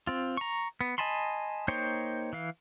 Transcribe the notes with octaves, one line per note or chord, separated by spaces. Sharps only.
C4 F4
A#5 C#6
B3
D#5 G#5 A5 B5 C6
A#3 D#4 C5 C#5 G5
E3 F5